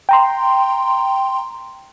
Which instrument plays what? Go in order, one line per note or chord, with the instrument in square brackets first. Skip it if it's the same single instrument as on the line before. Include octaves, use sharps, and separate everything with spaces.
[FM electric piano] G5 A#5 C6